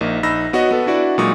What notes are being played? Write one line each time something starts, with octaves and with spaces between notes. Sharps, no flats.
A#1 A#3 D#4
A#1 D#4 B5 E6 A#6
B3 F#4 C#5 D#5
B3 A4 B4
D4 E4 F#4 D5
A#2 F#3 G#3 D#4 C#6 D#6